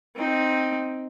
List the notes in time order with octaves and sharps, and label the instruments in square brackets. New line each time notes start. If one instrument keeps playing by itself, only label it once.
[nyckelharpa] C4 D#4